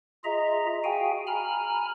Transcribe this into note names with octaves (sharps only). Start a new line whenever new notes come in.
F4 G#4 D#5 E5 A#5
F#4 G#4 F5 G5 G#5
G#5 A#5 B5 F6